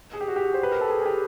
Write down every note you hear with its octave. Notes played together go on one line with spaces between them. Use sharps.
G#4
G4
F#4
G4
C5
B4
A#4
A4
G#4
G#4
G4